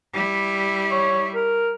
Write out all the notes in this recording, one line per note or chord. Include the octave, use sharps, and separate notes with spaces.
G3 E4
C#5
A#4